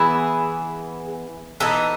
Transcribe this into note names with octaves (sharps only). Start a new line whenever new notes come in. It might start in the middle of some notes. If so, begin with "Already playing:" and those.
Already playing: E3 B3 E4 G#4
E3 B3 D#4 A4